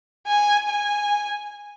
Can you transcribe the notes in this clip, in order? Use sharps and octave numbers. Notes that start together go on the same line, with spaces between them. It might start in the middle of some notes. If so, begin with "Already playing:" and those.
G#5
G#5